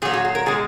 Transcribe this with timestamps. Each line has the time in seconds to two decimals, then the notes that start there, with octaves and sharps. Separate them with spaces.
0.02 A#2 G#4
0.05 F#3
0.13 F#4
0.25 G#4
0.35 A#4
0.46 B2 G#3 G#4